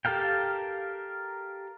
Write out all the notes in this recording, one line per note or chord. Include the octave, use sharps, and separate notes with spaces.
G4 A4 A#4 F5 G5